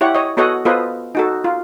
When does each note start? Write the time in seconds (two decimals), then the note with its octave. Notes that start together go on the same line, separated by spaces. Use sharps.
0.01 E4 G4 C#5 F#5
0.15 C#5 D#5
0.37 B3 F#4 A4 C#5 D#5 F#5
0.65 B3 F4 A4 B4 C5 D#5
1.15 D#4 F#4 A4
1.44 F4